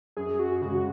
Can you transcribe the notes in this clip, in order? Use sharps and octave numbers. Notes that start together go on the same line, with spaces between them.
F#2 G#4
F#4
C#3 G#3 F#4